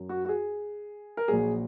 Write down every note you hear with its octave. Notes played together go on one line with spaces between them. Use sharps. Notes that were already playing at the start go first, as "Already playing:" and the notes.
Already playing: F#2
F#4
F#4
G#4
A#4
A#1 A#2 F#3 G#4